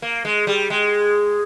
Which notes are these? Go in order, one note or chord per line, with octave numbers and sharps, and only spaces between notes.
A#3
G#3
G3
G#3